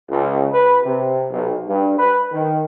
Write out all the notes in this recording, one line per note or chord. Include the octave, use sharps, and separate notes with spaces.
C#2
B4
C3
B1
G2
B4
D#3